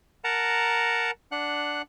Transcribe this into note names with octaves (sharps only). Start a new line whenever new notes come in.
A#4 F#5 A5 A#5
D4 F#5 F#6